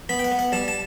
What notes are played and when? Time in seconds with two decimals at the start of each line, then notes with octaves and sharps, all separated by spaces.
0.09 B3 B5
0.19 G5
0.24 F#5
0.32 B3
0.39 F#5
0.52 G3 A5
0.68 A5